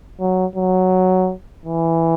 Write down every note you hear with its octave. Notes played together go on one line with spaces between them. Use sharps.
F#3
F#3
E3